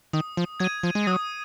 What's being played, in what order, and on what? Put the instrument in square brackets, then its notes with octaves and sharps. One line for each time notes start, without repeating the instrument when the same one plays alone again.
[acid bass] D#3 [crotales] D#6
[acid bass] F3
[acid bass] F#3 [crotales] G#6
[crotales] D#7
[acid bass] F3
G#3
[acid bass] F#3 [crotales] D#6